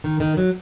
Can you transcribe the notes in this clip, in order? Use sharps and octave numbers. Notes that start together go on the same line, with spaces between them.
D#3
D#3
F#3